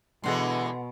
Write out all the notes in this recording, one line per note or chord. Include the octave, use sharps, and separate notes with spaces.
B2 D3 E3 G#3 A4 F#5 C6